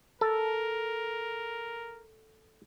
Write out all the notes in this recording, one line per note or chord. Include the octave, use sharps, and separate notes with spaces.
A4 A#4